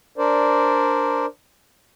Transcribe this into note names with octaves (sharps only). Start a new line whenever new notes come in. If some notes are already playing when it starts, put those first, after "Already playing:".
D4 A#4 C5 D5